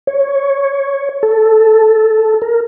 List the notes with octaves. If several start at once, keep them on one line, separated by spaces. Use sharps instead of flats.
C#5
A4
A#4